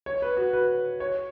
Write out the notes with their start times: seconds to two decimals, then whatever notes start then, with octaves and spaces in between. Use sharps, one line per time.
0.06 C#5
0.22 B4
0.37 F#4
0.53 B4
1.00 C#5